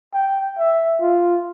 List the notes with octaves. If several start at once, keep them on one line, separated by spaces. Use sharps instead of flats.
G5
E5
F4